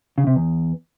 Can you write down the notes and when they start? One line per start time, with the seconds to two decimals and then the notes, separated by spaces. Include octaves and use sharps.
0.18 C#3
0.27 C3
0.36 E2